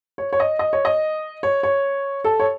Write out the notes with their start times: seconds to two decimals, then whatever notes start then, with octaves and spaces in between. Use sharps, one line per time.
0.18 C#5
0.33 C#5
0.40 D#5
0.59 D#5
0.73 C#5
0.85 D#5
1.43 C#5
1.63 C#5
2.24 A4
2.40 C#5